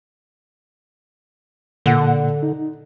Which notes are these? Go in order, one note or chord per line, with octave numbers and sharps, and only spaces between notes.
A#2 D3 F#5
D#4